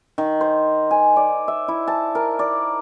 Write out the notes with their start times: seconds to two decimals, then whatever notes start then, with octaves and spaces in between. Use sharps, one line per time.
0.18 D#3
0.41 C5
0.91 G#5
1.16 D5
1.48 E5
1.68 E4
1.87 A5
2.15 A#4
2.39 D5